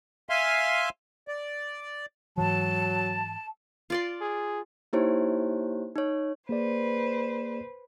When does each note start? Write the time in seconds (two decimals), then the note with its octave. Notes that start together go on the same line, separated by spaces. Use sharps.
0.29 E5 F5 G#5 C6
1.28 D5
2.37 G#2 E3 F#3 A5
3.90 F4 D5 C6
4.21 G#4
4.93 A#3 D#4 E4 G4 C5 C#5
5.96 D#4 C#5
6.49 A#3 G#4 B4 C5 D5